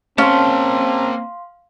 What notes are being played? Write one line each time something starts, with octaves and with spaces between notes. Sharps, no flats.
A#3 C4 C#4 F5 A5 C6